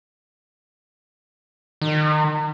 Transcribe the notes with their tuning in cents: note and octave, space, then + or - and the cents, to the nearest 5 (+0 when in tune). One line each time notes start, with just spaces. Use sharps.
D#3 -30